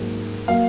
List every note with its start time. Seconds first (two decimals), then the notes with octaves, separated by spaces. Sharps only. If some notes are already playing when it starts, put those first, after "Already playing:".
Already playing: G#2 F#3 A#3
0.48 F#3 A#3 F5